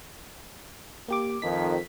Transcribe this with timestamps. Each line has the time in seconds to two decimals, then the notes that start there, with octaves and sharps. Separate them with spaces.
1.08 A#3 G4 D6
1.42 F2 D#3 B6